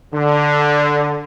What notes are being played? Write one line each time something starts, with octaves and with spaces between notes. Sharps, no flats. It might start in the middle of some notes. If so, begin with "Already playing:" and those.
D3